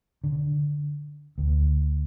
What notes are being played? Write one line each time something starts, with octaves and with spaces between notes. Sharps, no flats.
D3
D2